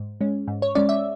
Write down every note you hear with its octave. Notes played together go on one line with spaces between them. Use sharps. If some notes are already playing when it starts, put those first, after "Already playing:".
Already playing: G#2
G#3 C#4
G#2
C#5
G#3 C#4 D5
E5